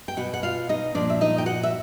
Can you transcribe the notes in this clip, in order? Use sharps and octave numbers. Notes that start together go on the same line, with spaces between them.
G5
B2 F#4 F#5
F#5
F4 F5
D#4 D#5
A#2 F3 D4 D5
E5
D#4 D#5
G5
F#4 F#5
E5